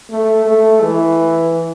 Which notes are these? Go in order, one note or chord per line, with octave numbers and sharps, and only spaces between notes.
A3
A3
E3